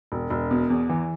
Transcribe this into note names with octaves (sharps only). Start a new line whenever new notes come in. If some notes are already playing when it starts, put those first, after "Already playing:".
E1
E1
B2
E2
E3